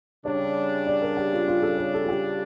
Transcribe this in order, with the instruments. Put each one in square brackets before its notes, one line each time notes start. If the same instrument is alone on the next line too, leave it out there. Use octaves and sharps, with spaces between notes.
[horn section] C#3 G3 D4 [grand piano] C#5
[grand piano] D5
A#4
G4
F4
F4
A4
C#5
A4
F4
G4